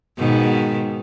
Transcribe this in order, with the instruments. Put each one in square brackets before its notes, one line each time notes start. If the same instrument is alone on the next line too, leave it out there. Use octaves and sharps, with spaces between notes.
[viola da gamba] G#2 B2 D#3